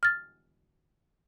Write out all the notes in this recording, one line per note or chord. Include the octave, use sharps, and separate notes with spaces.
F6 A6